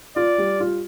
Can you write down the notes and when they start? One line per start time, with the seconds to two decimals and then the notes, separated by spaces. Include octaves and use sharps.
0.16 F4 D5
0.38 G3
0.60 F4